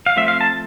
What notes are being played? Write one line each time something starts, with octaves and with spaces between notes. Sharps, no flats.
F5
F3 A3 C4 E5
F5
A5